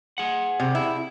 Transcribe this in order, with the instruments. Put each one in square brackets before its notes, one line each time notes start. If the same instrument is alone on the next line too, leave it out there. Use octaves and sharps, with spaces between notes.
[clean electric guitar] G#4 F#5
[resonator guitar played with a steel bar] C3
E4